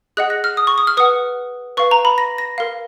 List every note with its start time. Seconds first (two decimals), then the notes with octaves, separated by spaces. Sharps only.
0.17 G#4 D#5 F#5 F#6
0.30 A#6
0.44 F6
0.57 D#6
0.67 C#6
0.78 D#6
0.87 F6
0.97 B4 F#5 D#6
1.77 B4 F5 C#6
1.91 A#5
2.05 B5
2.18 A#6
2.38 A#6
2.58 A#4 F5